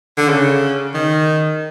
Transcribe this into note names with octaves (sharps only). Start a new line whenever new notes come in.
D3
C#3
D#3